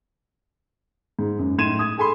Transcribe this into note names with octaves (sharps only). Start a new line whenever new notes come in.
G#2
F#2
A2 D#4 C6 G#6 D#7 E7
D#6 G#6
G#4 A4 G#5 B5 C6